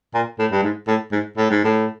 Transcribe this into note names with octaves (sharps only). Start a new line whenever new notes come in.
A#2
A2
G2
G#2
A2
G#2
A2
G#2
A2